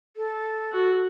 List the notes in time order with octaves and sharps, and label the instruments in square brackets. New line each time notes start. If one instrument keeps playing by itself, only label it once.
[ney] A4
[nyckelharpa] F#4